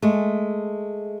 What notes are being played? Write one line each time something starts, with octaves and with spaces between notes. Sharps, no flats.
G#3 A3